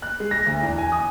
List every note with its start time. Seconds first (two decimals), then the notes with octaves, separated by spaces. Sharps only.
0.02 F#6
0.20 G#3
0.31 A#6
0.46 D2
0.62 E2
0.78 G#5
0.92 D#6